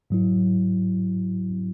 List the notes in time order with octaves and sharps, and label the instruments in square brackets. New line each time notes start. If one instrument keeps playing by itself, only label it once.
[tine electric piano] G#2 F#3 E4